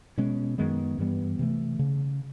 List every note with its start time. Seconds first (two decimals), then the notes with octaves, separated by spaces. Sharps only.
0.18 B2 G#3 C#4
0.58 F#2 D#3 G#3 B3
0.98 G2 E3 G3 B3
1.39 C3 E3 A3
1.79 C#3